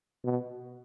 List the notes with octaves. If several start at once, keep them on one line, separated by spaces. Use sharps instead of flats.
B2